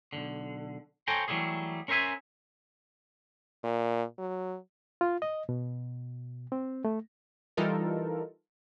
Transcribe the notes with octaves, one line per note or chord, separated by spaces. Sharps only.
B1 E2 D3
A4 C5 C#5 G5 G#5 A#5
E3 F#3 G3 A3 G#4
C#4 A#4 C5 E5 G#5
A#2
F#3
F4
D#5
B2
C4
A3
E3 G3 D#4 F4 A4 A#4